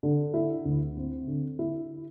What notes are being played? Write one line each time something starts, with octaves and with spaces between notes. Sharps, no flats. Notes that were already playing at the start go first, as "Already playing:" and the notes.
D3
E4
D2
C4
D3
E4